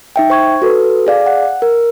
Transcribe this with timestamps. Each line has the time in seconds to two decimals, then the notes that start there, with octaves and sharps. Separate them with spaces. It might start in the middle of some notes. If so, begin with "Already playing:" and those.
0.16 D#4 E5 G5
0.30 C5 C#6 G#6
0.62 F#4 A4 B4
1.07 G#4 D5 F5
1.26 F#5
1.62 A#4